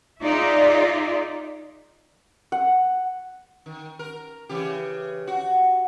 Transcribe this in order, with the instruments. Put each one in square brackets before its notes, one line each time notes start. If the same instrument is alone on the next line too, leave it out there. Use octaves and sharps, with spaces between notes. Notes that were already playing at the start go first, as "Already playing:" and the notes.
[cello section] D#4 F4 G#4 D5 E5
[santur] F#5
[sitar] D#3
A#4
C#3 E3 G4
F#4